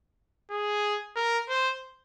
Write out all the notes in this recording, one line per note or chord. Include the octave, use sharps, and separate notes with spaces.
G#4
A#4
C5